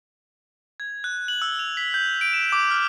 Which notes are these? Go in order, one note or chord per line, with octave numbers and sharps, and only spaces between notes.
G#6
F#6
F#7
E6
F7
B6
G6
D7
E7
D6
F6